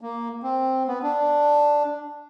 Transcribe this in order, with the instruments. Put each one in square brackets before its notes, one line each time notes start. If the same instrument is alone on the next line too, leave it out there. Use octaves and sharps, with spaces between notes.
[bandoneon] A#3
C4
B3
D4